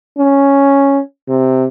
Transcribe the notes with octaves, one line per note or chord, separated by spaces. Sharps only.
C#4
C3